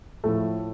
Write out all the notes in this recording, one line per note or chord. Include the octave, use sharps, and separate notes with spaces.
A2 F3 A3